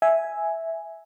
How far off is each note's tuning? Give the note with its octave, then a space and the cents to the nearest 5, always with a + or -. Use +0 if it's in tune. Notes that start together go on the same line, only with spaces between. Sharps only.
E5 -5 G#5 +0